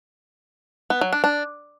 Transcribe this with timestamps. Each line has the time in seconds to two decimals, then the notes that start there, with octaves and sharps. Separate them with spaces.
0.90 B3
1.01 F#3
1.13 D4
1.24 D4